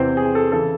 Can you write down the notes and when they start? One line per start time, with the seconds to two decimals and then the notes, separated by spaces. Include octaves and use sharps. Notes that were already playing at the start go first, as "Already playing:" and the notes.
Already playing: E2 C3 E3 C4 C5
0.17 G#4
0.35 A4
0.52 C#3 E3 A4